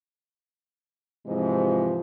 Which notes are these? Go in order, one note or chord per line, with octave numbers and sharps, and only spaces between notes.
G#2 C3 E3 F3 G#3